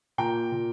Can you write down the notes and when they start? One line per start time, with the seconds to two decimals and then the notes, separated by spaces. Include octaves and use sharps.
0.18 A#2 G5 A#5
0.52 A#2